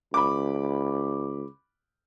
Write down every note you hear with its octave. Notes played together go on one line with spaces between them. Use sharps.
C#2 B5 D6